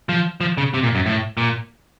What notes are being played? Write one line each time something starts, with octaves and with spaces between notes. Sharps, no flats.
F3
F3
C#3
C3
A#2
F#2
A2
A#2